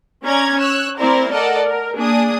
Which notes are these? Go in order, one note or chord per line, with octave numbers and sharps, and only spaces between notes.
C#4 D5 A#5 G#6
C#5 E6 F#6
A3 C4 E4 A#4 C5 D5
A4 A#4 D5 D#5 F#5
A#4
A#3 D4 G#4 D#6